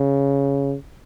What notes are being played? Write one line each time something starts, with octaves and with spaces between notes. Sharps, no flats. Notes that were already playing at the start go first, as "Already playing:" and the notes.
Already playing: C#3